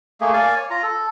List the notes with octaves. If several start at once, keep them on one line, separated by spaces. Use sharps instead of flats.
A3 A#3 G#4
A#3 D5 F5 G#5
C#5
F4 A#5
A4